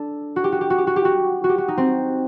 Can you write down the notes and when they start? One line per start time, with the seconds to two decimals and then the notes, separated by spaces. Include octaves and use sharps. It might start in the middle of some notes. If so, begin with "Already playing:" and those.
Already playing: D4 A4
0.36 F#4
0.44 G4
0.52 F#4
0.61 G4
0.70 F#4
0.78 G4
0.87 F#4
0.96 G4
1.05 F#4
1.44 F#4
1.49 G4
1.58 F#4
1.68 D#4
1.77 C4